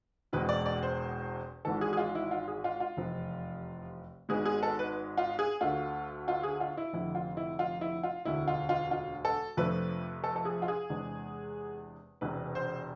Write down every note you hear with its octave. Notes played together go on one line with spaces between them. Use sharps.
E1 E2 B2 G#3 C4 B4
D5
D5
C5
G#1 G#2 E3 A4
G#4
G#4
F4
E4
F4
G#4
F4
F4
F1 E2 C3 F3
G#1 G#2 G#3 B3 G#4
G#4
A4
B4
F4
G#4
D2 D3 A3 F4
F4
G#4
F4
E4
F1 F2 D3 E4
F4
E4
F4
E4
F4
E1 D2 D3 E4
F4
F4
F4
A4
F2 C3 F3 A3 D4 B4
A4
A4
G#4
F4
G#4
E2 C3 G#3 D4
E1 E2 C3 B4
C5